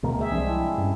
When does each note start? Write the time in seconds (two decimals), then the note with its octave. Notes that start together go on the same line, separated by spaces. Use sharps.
0.03 D2 B2 G#3 A#3 C4
0.19 G#4 E5
0.32 C2 F3 G#3 C4 D4
0.49 E4
0.78 G2 C#4